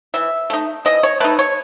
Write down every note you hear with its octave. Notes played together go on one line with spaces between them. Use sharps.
E3 E5
A3 D#4
E3 D#5
C#5
A3 D#4 B4
C#5